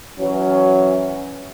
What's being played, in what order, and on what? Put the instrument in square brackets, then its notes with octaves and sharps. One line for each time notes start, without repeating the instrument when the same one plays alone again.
[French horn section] E3 F#3 C#4